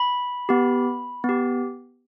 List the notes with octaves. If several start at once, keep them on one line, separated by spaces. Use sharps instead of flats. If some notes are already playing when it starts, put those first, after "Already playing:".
Already playing: B5
B3 G4
B3
G4